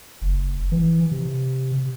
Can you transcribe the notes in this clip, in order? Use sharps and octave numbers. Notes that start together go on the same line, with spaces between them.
F#1
E3
C3